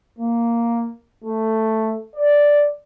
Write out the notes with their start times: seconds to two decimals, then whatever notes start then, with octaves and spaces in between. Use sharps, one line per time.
0.19 A#3
1.24 A3
2.16 D5